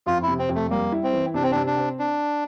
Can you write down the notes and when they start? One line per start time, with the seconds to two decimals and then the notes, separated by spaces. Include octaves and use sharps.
0.06 F2 F4
0.23 C3 E4
0.39 C4
0.49 F2
0.55 A3
0.70 G3 A#3
0.92 E4
1.03 C4
1.13 E3
1.34 C3 D4
1.43 C4
1.52 C3 D4
1.67 D4
1.77 C4
1.99 D4